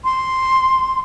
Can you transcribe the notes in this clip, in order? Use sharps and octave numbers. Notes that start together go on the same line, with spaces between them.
C6